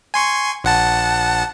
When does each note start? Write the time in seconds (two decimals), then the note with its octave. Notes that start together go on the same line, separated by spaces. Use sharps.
0.14 G#5 C6 C#6
0.64 A#1 F#5 A5